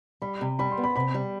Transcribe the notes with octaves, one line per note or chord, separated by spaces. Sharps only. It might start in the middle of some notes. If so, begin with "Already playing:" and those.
G3 B5
C3
G3 B5
C6
B3
B5
C3 B5
G3